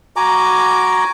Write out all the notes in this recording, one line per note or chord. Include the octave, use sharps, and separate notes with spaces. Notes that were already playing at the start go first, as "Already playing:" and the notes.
F#4 G#5 A#5 D6